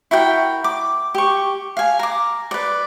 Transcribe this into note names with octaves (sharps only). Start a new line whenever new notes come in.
E4 F#4 A#4 G5
D6
G4 C#6
F5 G#5
A#5 D6
B4 D5